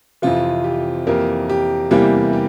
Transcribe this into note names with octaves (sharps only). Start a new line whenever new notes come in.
F2 C3 E3 F4
G4
F2 E3 A#3 G4 A#4
G4
E2 C3 E3 G3 A#3 G4
G4